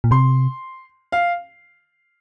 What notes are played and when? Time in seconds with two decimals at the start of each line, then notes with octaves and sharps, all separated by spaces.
0.04 A#2
0.11 C3 C6
1.12 F5